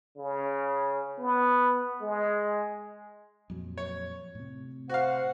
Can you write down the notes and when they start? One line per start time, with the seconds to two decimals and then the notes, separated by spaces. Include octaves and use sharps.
0.17 C#3
1.19 B3
2.02 G#3
3.50 F2 A#2 F#3
3.78 C#5
4.35 A2 C3
4.90 F#4 C5 F5 F#5